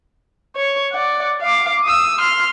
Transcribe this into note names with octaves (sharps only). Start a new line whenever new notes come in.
C#5
D5 F#5
F5 D6
D#6 E6
C6 F6